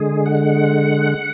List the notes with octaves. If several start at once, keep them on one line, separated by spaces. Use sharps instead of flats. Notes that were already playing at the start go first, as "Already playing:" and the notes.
Already playing: D3 G#3 G#4
F#5